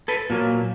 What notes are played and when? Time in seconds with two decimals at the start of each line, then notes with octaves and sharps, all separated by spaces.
0.08 A4 B4
0.30 A#2 F#3 A#3